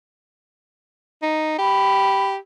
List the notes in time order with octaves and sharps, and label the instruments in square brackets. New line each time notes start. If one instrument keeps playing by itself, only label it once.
[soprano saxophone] D#4
[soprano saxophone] G4 [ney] B5